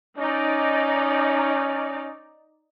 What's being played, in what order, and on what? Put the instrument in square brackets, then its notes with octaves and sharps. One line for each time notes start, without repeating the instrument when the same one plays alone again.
[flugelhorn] C#4 [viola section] D#4 D5